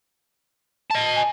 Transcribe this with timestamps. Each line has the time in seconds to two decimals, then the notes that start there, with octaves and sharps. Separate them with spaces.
0.91 D#5 A5
1.16 G#5